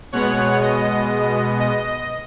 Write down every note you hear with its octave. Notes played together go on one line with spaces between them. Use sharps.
B2 G#3 B3 C#5 F#5
D#5
D#5